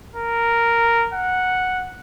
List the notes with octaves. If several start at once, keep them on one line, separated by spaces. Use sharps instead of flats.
A#4
F#5